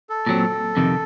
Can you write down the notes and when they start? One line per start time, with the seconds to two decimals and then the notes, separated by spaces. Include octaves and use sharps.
0.10 A4
0.26 A#2 F#3 C4
0.77 F2 C3 D#3